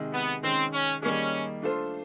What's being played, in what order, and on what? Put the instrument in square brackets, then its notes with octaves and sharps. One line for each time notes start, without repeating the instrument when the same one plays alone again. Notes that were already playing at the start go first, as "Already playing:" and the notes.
Already playing: [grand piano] C3 D#3 G#3
[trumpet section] B3
[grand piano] D#3 G#3 C#4 [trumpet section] C4
[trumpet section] C#4
[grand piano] D#3 G3 A#3 D#4 G#4 [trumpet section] C#4
[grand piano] A3 D4 F4 A4 C5